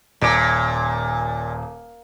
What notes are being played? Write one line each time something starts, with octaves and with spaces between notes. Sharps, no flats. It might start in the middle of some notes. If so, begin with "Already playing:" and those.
D#1 A#2 D6